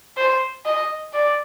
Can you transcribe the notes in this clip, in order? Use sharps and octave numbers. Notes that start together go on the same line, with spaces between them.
C5
D#5
D5